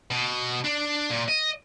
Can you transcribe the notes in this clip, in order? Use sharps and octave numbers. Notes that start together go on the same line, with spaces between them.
B2
D4
A#2
D#5